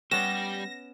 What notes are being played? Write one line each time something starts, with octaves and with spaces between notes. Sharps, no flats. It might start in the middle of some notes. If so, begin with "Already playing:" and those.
G3 B3 C#4 G4 A#6 E7